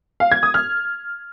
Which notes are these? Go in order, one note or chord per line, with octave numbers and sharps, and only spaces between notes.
F5
G#6
D#6
F6